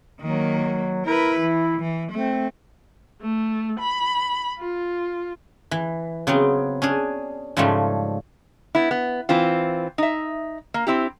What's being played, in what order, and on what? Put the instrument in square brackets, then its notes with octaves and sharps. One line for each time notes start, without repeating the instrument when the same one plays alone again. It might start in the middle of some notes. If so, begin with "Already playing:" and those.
[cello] D#3 A#3 [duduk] F#3
[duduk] E4 [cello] A#4 B4
[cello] E3
E3
[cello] A3 [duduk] C4
[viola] A3
B5
F4
[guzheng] E3
C#3 F#3 B3 C4
C#4 D4 G#4
G#2 C#3 F3 G3 A3
[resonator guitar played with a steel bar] B3 E4
B3
E3 C4 F4
D#4 E5
A#3
C4 E4 G4